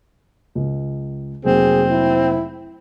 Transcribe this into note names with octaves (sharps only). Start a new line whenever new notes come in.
C#2
F1 F#3 A#3 C4 G#4
E4